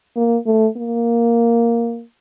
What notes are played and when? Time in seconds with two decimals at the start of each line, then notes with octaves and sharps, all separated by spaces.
0.16 A#3
0.46 A3
0.77 A#3